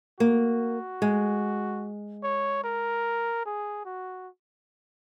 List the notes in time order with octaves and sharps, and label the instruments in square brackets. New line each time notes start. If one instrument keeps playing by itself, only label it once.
[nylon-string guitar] A#3 [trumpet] F#4
[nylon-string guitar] G#3
[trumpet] C#5
A#4
G#4
F#4